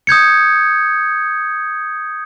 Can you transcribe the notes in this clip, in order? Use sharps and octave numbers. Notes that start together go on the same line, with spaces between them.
D#6 G6 G#6 C#7